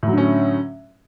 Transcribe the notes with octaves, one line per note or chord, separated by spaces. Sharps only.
A2 D3 F#3 C#4